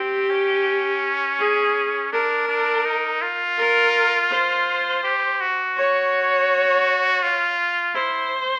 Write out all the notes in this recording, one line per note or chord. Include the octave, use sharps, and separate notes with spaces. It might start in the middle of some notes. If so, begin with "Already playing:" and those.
Already playing: C4 G4
C#4
G#4
D4 A#4
D4
D#4
F4
A#4
C5
G4
F#4
C#5
F4
E4 C5